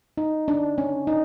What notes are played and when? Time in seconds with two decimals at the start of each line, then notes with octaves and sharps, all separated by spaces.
0.18 D#4
0.48 D4
0.78 C#4
1.07 D#4